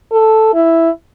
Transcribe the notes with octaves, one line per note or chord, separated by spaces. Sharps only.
A4
E4